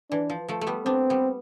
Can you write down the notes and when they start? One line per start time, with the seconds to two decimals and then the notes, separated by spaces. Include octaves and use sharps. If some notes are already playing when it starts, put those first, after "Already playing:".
0.11 E3 D4
0.30 F3
0.48 F3 A3
0.61 A3
0.67 G3 B3
0.86 B3 C4 D4
1.10 G3 B3